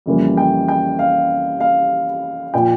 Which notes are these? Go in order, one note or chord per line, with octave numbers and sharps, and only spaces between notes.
F2 C#3 E3 G3 A#3
G5
G5
F5
F5
A#2 F3 G5